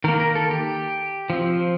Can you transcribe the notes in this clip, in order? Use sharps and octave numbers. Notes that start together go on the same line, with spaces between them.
D#3 A#3 A#4
A#4
A4
G4
F3 C4